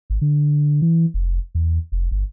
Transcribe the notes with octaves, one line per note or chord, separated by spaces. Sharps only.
G#1
D3
E3
F1
E2
F1
G1